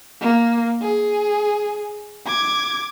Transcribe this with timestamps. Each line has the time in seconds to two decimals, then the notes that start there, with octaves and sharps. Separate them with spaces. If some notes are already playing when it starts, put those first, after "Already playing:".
0.22 A#3
0.82 G#4
2.27 D6 G#6